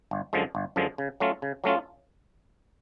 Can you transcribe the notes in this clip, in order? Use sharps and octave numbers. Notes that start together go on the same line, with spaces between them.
G1
F#2 D3 F3 G#3
G1
F#2 D3 F3 G#3
C#3
F#3 A3 C#4 F4
C#3
F#3 A3 C#4 F4